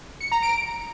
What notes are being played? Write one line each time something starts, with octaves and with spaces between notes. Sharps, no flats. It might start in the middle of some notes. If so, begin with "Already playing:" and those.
C#7
A#5
D7